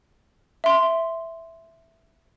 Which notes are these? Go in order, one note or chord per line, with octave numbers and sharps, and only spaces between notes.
E5 C6